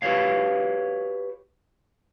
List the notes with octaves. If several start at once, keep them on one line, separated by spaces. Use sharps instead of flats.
F#4 G4 B4 C#5 F5